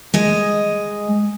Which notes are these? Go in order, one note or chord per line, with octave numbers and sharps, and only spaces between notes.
G#3 D#5